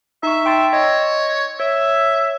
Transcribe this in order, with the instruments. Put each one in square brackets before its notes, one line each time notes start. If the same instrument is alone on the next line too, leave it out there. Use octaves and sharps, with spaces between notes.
[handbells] D#4 C#6 [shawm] E5
[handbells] G5 C6 A6
[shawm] C#5 [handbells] D#5
[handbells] C#5 [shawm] E5